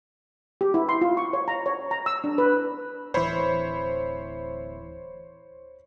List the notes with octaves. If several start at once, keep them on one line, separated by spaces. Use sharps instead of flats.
G4
E4
C6
F4
C#6
C#5
A#5
C#5
A#5
E6
D4
B4
D1 E3 C5 C#5 B5